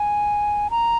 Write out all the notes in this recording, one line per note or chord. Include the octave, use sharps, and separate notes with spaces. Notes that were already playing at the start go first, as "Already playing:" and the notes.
Already playing: G#5
A#5